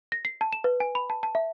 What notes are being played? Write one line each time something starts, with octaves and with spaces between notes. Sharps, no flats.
A#6
C7
A5
E7
B4
G#5
B5
A5
A5
E5